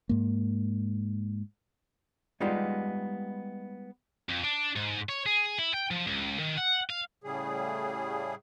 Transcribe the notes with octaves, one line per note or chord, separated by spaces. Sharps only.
G#2 A#3
G3 G#3 B3 D#4 F4 G4
F2
D4
G#2
C#5
G#4
E4
G5
F3
C#2
D#3
F#5
F5
A2 C#3 G3 G#4